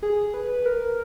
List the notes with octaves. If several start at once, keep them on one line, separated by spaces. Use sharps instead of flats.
G#4
B4
A#4